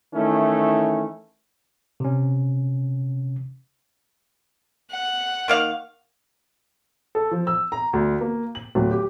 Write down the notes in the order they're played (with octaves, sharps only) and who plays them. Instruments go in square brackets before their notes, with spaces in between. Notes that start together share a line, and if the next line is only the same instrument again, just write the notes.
[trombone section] D#3 E3 A3 C#4 E4
[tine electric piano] C3 C#4
[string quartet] F#5
[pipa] D#3 A#3 F5
[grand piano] A4
F3
E6
A#5
D2
A#3
F#7
D1
G4